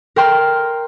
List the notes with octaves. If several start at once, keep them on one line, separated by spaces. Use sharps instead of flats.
A#4 G5 C6 F6